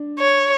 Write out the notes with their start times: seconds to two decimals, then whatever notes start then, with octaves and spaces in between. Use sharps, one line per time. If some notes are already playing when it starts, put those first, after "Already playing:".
Already playing: D4
0.19 C#5